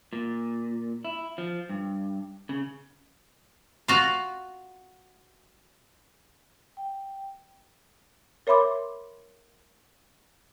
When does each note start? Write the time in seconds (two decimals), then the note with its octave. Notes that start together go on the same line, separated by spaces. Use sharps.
0.13 A#2
1.05 E4
1.38 F3
1.69 G2
2.49 C#3
3.88 F4 F#4
6.77 G5
8.47 A#4 C#5 E5 B5 C6 D6